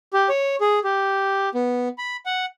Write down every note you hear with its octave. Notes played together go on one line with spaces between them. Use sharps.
G4
C#5
G#4
G4
B3
B5
F#5